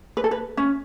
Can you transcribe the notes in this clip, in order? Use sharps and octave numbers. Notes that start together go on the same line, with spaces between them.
B4
A4
B4
C#4